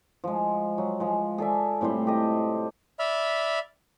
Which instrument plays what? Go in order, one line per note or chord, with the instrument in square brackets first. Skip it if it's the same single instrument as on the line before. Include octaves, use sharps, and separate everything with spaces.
[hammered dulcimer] F3 G#3
F#3
F3 G#3
G#4 A4 D5 E5
A2 C3 G3 C5
G4 A4 D#5
[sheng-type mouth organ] D5 E5 B5 F6